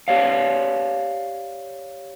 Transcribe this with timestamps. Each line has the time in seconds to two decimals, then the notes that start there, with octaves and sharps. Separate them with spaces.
0.08 G4 C#5 D5 F5